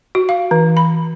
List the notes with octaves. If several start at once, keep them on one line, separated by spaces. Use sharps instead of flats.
F#4
F5
E3
B5